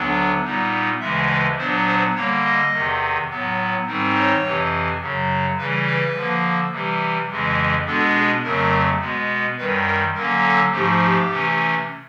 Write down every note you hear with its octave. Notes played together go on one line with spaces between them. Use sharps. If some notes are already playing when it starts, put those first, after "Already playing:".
Already playing: D2 D3 F#3 B3 D4
A#2 G3 B3 D#4
D2 C#3 E3 G#3 E5
B4
A#2 F#3 B3 D4 C5
C5
D3 G3 A#3 C#5
D#5
E2 C3 D#3
A2 F#3 B3
G#2 D#3 G3 C4 D#4
C#5
F2 C3 E3
F#2 C#3 F#3
C#3 E3 G3 B4
B4
D3 F3 A#3
C3 E3 G3
F2 C#3 E3 G#3
B2 G#3 B3 D4 A4
G#4
F2 C#3 F#3 A3 A#4
B2 G#3 B3
F#2 D#3 G3 B4
A#4
D3 F#3 A#3 C#4 A#4
A4
G#2 F3 A3 G4
G4
C3 E3 A3 C#4